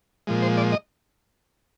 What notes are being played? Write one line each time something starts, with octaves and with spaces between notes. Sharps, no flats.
A#2 F3 G#3
C5
D5
D#5